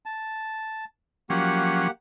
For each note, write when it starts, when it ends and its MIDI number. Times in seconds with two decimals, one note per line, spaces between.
0.06 0.85 81
1.30 1.88 53
1.30 1.88 54
1.30 1.90 58
1.30 1.88 61
1.30 1.90 67
1.30 1.90 78